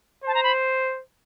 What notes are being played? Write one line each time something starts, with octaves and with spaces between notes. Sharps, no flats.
C5 A5
A#5
B5